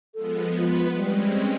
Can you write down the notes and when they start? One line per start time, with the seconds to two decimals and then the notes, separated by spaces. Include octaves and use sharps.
0.14 F3 G#3 B3 A4
0.58 B3 F4 B4
0.95 G3 G#3 C4 C#4